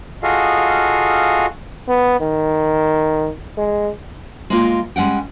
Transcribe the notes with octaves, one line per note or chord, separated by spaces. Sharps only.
F4 F#4 G#4 A4 D#5 F5
B3
D#3
G#3
G#3 A#3 F4
G3 G#3 C#4 F#5 G5